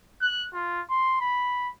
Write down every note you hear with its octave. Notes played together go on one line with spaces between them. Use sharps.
F#6
F4
C6
B5